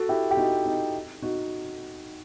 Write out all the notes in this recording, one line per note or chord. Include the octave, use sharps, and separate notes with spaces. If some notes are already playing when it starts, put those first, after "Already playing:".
Already playing: F#4 A4
E4 G4
G4
D#4 F#4
D#4
D#4 F#4